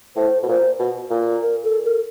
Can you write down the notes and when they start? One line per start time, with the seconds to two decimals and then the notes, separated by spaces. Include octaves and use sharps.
0.16 A2 C5
0.43 B2
0.48 A#2 C5
0.80 B2
1.10 A#2
1.42 A#4
1.64 A4
1.84 A#4